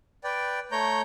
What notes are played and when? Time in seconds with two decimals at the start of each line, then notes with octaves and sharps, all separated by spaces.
0.24 B4 D5 G5
0.72 A3 C#5 A#5 G6